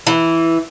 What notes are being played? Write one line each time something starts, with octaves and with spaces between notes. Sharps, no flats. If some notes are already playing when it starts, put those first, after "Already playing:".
E3